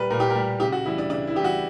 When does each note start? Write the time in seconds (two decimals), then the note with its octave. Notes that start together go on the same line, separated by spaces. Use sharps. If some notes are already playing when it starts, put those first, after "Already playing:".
Already playing: A#2 G3 A#4 B4
0.10 A#2 A#4
0.20 G4
0.30 A#4
0.35 G3
0.60 C#3 G4
0.72 F#4
0.86 E3 G3 E4
0.98 D4
1.10 C#3 D4
1.27 E4
1.35 E3 G4
1.40 G3 F#4